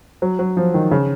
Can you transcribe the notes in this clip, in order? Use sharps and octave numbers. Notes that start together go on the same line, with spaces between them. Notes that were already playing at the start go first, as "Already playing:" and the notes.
F#3
F#3
F3
D#3
C#3